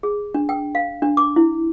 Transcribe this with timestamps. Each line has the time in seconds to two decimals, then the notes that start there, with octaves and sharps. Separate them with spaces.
0.03 G#4
0.34 D4
0.49 G5
0.75 F5
1.02 D4
1.17 D6
1.36 E4